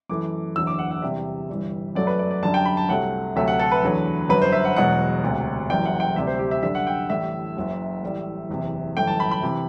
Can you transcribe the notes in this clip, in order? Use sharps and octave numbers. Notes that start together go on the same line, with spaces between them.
F#2 E3 A3 D6
F#1 E2 D3 F#3 E6
D6
F#5
F#5
E2 C3 G3 E5
G1 G2 E3 G3
F#2 F#3 A3 D5
B4
D5
D5
F#2 D3 G3 A5
G5
B5
A5
C2 C3 F#3 A3 F#5
D2 C3 F#3 A3 E5
F#5
A4
B4
E2 D3 F#3 A3
G1 F#2 D3 F#3 B4
C5
E5
F#5
E1 E2 B2 F#3 F#5
E1 D2 C3
F#1 F#2 E3 G3 G5
F#5
G5
D2 C3 G3 E5
C5
G4
E5
F#2 D3 G3 E5
F#5
G5
A1 A2 G3 E5
F#1 F#2 F#3
A1 A2 G3
F#1 E2 C3
G1 F#2 E3 A3 G5
A5
B5
B5
C3 E3